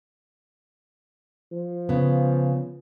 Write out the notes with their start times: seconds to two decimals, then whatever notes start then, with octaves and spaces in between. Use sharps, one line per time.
1.52 F3
1.89 C#3 B3